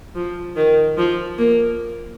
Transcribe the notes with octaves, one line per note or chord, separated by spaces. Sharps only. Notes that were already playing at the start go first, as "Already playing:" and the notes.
F3
D#3
F3
A#3